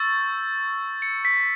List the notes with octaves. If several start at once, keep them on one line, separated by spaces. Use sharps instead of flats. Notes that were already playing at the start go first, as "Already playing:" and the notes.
Already playing: C#6 E6 G6 A6
C#7
B6